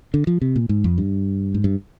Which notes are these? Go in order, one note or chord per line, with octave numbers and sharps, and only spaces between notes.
D3
F3
C3
A#2
G#2
F2
G2
G#2
G2